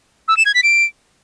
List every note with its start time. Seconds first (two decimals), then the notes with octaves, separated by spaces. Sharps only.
0.28 E6
0.37 E7
0.46 G#6
0.54 B6
0.63 D7